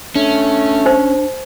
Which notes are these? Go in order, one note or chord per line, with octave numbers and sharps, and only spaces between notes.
A3 C#4 D4
D#4 C5